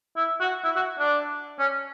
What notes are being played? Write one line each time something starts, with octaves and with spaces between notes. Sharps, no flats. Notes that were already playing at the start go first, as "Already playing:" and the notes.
E4
F#4
E4
F#4
D4
C#4